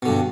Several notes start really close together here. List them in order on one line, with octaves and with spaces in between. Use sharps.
B2 D3 G2